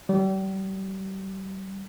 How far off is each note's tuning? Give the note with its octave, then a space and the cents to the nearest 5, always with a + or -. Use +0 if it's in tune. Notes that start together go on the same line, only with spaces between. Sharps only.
G3 -35